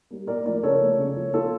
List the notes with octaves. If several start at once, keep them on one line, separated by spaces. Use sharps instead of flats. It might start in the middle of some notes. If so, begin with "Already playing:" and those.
G3 A#3
A#2 A#4 D5
F3 A3 A#4 D5
C#3 A4 C#5
F3 A3
C#3
F3 A#3
A#2 F4 A4